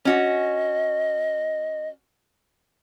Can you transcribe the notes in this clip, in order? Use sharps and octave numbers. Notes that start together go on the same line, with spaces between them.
C#4 F#4 D#5